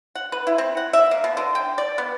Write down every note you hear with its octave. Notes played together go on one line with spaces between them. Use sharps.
F#5
B4
E4
C4
F#5
E5
A#3
B2
D3
G5
D5
B3